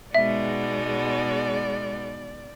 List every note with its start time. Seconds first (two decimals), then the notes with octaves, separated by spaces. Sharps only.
0.15 B2 G#3 B3 D#4 D5 E5